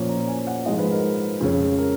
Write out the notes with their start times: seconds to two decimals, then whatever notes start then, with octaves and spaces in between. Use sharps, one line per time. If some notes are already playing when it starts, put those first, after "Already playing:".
Already playing: A#2 F3 A#3 C#4
0.09 A#5
0.28 G#5
0.47 F#5
0.66 G#2 F3 G#3 D#5
0.78 B4
0.91 A#4
1.40 F2 C#3 G#3 C#4
1.78 A#4